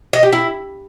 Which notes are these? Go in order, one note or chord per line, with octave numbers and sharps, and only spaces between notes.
D#5
G4
E4